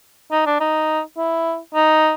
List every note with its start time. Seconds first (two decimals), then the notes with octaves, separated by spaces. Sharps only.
0.31 D#4
0.46 D4
0.60 D#4
1.17 E4
1.75 D#4